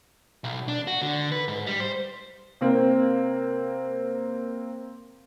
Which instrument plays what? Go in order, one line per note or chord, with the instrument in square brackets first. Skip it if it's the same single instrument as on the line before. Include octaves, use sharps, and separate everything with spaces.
[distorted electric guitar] B1
D4
F#4
D3
B4
G#2
G3
C5
[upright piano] C3 A#3 C4